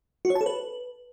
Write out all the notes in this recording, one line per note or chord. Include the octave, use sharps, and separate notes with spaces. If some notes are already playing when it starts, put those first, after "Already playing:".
F#4
C#5
A5
A4
B4